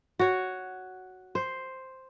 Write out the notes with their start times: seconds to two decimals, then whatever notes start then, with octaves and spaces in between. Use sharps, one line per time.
0.19 F#4 C#5
1.35 C5